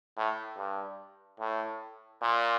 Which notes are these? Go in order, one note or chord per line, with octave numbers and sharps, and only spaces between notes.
A2
G2
A2
A#2